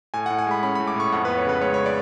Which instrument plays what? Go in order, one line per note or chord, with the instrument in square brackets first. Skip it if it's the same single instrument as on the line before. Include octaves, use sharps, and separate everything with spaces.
[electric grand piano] A2 G#5
A2 F#5
G#5
G#3 B5
C#4 B5
A2 B5
D6
A2 C#6
F2 F#5
B3 B4
C#5
C#3 B4
G#3 C#5
C#5
D5